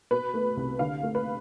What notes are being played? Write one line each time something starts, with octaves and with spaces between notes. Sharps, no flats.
B2 B4
A3
C2
D3 F5
A3
B4